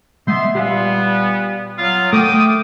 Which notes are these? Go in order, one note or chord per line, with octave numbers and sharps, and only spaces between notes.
G#3 B3 E5 C6
A#2 G3 B3 G4 F5
F#3 B3 F4
A3 G5 D6 D#6
A3